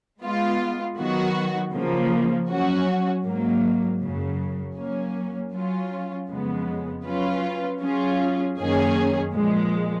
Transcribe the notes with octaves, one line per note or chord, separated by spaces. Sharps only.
G#3 B3 F4
D#3 F#3 B3 F#4
C#3 F3 A#3
F#3 C#4 F#4
G#2 F#3 A#3
F#2 C#3 F#3
F#3 A#3 C#4
F#3 C#4 F4
F2 C#3 G#3 B3
F#3 C#4 F4 B4
F#3 C#4 F4 G#4
F#2 D#3 A#3 C#4 G#4
A#2 F3 G#3